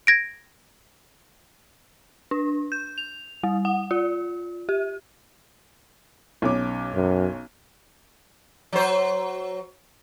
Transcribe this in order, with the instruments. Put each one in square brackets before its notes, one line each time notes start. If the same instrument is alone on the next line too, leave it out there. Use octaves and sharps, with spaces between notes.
[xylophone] G#6 A#6 D7
[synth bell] D4
G6
F7
G3
F#5
F4
G4
[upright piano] B1 C#4 D6
[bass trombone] F#2
[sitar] F#3 C5